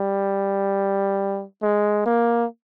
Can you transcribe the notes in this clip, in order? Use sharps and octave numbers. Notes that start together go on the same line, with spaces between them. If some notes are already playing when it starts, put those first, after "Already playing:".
Already playing: G3
G#3
A#3